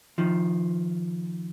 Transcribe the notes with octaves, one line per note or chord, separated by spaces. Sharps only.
D#3 F3